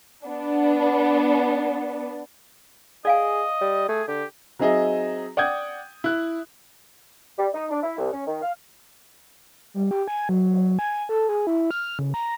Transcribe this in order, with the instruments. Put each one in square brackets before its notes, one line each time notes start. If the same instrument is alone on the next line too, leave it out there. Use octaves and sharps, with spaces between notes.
[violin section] B3 D4
[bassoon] G#4 [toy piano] D5 F5 G#5 [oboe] D#5
[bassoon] G3
[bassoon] A3 [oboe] G#4
[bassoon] D3 [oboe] G4
[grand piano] F#3 C4 D#4 G#4 D#5 E5
D5 F#5 G5 D#6 G6 G#6
E4 F#6
[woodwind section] G3
D#4
D4
E4
C2
C#4
D#3
F5
[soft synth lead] G3
G4
G#5
F#3
F#3
G#5
A4
G#4
E4
F6
C#3
A#5